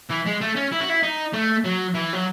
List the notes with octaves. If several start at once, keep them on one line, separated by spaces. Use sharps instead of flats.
E3
G#3
A3
C#4
E4
F#4
E4
D#4
A3
F#3
E3
F#3